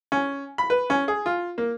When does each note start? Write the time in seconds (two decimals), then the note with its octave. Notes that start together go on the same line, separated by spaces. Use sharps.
0.12 C#4
0.58 B5
0.70 B4
0.90 C#4
1.08 G#4
1.26 F4
1.58 A#3